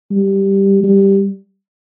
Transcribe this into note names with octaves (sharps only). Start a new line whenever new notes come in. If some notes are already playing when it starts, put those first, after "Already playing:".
G3
G3